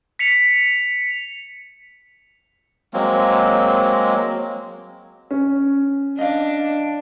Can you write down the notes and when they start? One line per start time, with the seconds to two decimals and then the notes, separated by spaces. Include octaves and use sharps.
0.19 B6 C#7 F7
2.94 F#3 G#3 A#3 C4
5.31 C#4
6.18 D4 D#5 F5